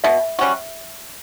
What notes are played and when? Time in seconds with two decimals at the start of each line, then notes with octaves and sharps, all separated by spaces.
0.04 B2 E5
0.39 G3 C#4 F#4